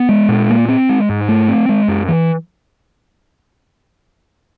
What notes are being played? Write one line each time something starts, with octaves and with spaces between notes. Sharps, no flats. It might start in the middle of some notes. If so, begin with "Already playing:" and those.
Already playing: B3
G#3
A#2
A#3
C4
G#3
G#2
A3
C4
G#3
F#2
E3